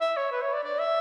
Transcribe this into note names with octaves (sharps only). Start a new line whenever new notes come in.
E5
C#5
B4
C#5
D5
D5
E5